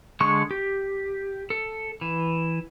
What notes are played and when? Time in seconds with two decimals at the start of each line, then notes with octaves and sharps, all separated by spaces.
0.20 D3 G#3 C#6
0.51 G4
1.50 A4
2.01 E3